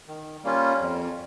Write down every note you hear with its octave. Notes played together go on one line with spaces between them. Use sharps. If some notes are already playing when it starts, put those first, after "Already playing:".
D#3
G3 A#3 C#4 F4
F2